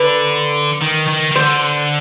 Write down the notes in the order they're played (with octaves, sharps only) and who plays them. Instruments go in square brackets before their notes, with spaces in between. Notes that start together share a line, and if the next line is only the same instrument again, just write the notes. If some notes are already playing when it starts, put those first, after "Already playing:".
Already playing: [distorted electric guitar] D3 [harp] B4
[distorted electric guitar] D#3
D#3
D#3
[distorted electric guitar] D3 [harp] C5